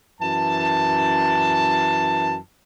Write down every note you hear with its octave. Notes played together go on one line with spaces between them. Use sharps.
F#2 E3 A5